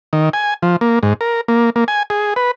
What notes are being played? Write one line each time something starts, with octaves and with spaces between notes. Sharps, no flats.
D#3
G#5
F3
A#3
G#2
A#4
A#3
A#3
G#5
G#4
B4